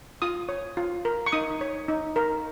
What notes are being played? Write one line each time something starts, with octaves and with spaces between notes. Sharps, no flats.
F4 D#6
C#5
F4
A#4
C#6
D#4 D#6
C#5
D#4
A#4